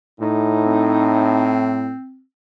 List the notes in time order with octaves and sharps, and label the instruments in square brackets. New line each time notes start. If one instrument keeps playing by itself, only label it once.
[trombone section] A2 [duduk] D#4
[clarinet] C4